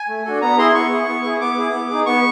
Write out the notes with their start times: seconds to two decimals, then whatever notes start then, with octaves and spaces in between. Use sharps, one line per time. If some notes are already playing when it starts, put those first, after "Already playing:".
Already playing: G#5
0.08 A3
0.25 D4 F#4 A4
0.42 B3 A#5
0.58 E4 G#4 C6
0.74 B3 C#6
0.91 E4 G#4
1.08 B3
1.24 E4 G#4
1.40 B3 D6
1.58 E4 G#4
1.73 B3
1.90 D#4 G#4
2.06 B3 C#6